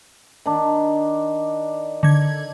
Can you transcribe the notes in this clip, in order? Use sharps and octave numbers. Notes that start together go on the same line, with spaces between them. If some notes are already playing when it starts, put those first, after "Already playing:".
D#3 D4
D3 G#6